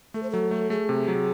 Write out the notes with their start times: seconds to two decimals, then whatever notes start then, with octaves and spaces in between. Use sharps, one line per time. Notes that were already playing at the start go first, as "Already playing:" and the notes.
0.14 A3 A4
0.23 C5
0.30 F#3 A4
0.51 A3
0.70 A3 G#4
0.89 C3
1.08 F#3